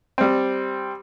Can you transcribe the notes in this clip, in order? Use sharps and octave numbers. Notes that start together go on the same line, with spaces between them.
G3 C4